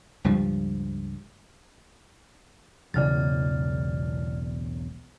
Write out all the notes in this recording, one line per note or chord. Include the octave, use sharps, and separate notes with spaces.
C#2 G2 F3 G3
E1 B1 E2 C#3 F#3 D5 F6 A6